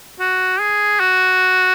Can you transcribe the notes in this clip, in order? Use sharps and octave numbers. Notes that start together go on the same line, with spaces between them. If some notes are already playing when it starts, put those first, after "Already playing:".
F#4
G#4
F#4